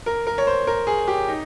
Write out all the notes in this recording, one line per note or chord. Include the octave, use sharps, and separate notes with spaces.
A#4
A#4
C#5
C5
A#4
G#4
G4
D#4